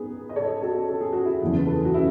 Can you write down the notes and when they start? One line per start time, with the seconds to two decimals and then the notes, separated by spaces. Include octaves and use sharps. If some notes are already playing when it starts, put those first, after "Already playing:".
Already playing: B3 D#4 G#4
0.29 D#5
0.36 A4 C#5
0.62 F#4 A4
0.89 A4
1.01 G#4
1.13 F#4
1.25 E4 G#4
1.42 F#1 E2 C#3 E3
1.58 B4
1.67 A4
1.76 G#4
1.85 F#4
1.94 C#4 E4